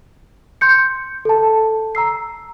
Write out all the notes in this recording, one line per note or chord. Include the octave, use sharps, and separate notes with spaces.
C6 G6 C#7
A4 A5
A#5 E6 C7